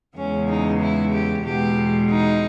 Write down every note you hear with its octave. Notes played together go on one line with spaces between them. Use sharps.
E2 C#3 G#3 C#4
D#4
E4
G4
E2 B2 G#3 G4
D#4